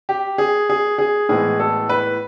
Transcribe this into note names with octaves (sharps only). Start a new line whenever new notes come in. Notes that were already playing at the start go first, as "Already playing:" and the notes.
G4
G#4
G#4
G#4
A2 E3 G#3 B3 G#4
A4
B4